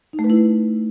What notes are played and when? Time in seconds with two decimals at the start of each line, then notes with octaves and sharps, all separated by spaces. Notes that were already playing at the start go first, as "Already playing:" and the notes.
0.13 D#4
0.19 A3
0.24 B4
0.30 E4